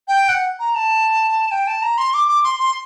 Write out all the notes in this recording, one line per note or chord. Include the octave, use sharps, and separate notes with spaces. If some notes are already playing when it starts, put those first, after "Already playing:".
G5
F#5
A#5
A5
G5
A5
A#5
C6
D6
D6
C6
C6